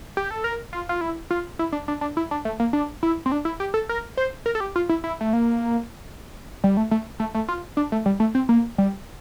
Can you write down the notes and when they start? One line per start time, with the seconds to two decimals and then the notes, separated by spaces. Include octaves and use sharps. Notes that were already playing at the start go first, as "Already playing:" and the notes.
0.17 G4
0.31 A4
0.44 A#4
0.73 F4
0.89 F4
1.01 E4
1.31 F4
1.59 E4
1.73 D4
1.88 D4
2.01 D4
2.17 E4
2.31 D4
2.45 A3
2.60 A#3
2.73 D4
3.03 E4
3.26 C4
3.32 D4
3.45 E4
3.60 G4
3.74 A4
3.89 A#4
4.17 C5
4.46 A#4
4.55 A4
4.60 G4
4.76 F4
4.89 E4
5.04 E4
5.21 A3
5.33 A#3
6.64 G3
6.77 A3
6.91 A3
7.20 A3
7.35 A3
7.48 F4
7.77 D4
7.92 A3
8.06 G3
8.20 A3
8.35 C4
8.49 A#3
8.78 G3